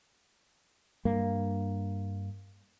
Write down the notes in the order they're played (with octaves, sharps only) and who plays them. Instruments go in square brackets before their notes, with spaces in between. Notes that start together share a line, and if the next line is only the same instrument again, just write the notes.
[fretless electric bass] G2 A#3